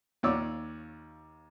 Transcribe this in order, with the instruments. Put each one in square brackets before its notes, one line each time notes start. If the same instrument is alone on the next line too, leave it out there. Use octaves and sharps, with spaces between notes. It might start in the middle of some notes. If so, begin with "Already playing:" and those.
[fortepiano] D#2 F4 C#5 D5 E6